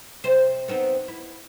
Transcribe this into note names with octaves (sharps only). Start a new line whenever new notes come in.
C3 C5
B3 C4 D#4
E4